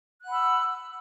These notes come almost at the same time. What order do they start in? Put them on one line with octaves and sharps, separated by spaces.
F#6 F#5 B5 E6